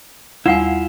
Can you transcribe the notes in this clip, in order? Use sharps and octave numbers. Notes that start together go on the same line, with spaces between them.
D#2 G3 E4 F4 F5 F#5 G#5